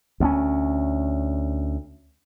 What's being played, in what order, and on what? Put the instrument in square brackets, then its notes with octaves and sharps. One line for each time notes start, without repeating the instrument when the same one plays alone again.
[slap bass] D2 B3 C#4